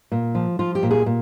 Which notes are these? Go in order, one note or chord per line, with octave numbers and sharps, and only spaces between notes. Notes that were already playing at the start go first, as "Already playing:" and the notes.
A#2
F3
F3 F4
G4
A#2
G#4
A#2